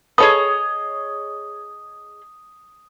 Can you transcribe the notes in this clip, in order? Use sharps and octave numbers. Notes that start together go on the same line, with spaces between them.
G#4 A4 B4 C#5 D#5 D#6